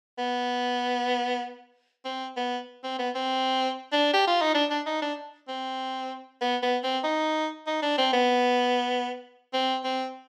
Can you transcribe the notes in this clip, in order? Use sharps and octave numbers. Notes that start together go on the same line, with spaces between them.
B3
C4
B3
C4
B3
C4
D4
G4
F4
D#4
D4
D4
D#4
D4
C4
B3
B3
C4
D#4
D#4
D4
C4
B3
C4
C4